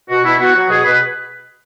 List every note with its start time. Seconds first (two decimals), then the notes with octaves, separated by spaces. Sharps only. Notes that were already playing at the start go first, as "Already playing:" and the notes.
0.09 B2 F#4
0.23 B2 E4
0.38 B3 F#4
0.53 F#3 F#4
0.68 B2 G#4
0.83 B2 B4